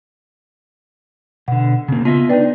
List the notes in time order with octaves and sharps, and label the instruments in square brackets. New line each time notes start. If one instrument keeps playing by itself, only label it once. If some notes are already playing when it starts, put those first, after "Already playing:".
[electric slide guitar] B2 D3 [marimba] F#5
[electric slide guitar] C#3 A#3 [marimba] C4
[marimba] B3 [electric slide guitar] F4 D#5 E5
[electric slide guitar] D4 D#4 [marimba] B4 D5 G5